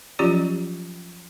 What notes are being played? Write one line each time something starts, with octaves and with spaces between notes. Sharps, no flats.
F3 F#3 C#4 F4 G4 D5